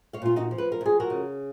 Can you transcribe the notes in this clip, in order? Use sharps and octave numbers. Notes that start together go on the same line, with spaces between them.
C#5 F5
A#2 F4
D#4 F#4
F3
B4
A#4
F2 G#4
F#4 A#4
C#3